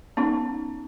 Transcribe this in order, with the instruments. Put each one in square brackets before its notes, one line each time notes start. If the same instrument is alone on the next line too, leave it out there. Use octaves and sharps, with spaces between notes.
[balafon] B3 C#4 D#4